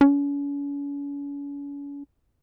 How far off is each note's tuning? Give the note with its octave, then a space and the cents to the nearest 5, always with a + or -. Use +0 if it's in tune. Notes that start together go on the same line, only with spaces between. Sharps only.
C#4 +40